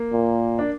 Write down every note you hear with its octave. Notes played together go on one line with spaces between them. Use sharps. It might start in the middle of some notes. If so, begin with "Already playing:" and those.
Already playing: A#3
A#2
D4